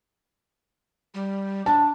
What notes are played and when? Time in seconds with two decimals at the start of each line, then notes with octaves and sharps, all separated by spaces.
1.14 G3
1.66 D4 A5